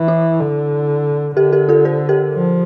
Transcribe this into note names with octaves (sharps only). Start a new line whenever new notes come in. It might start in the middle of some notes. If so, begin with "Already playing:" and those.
Already playing: E3
E4
D3
D3 G4 A#4
G4 A#4
F4 A4
A4 C5
G4 A#4
F3